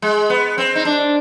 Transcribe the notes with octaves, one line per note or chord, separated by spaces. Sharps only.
G#3
B3
C4
D#4
D4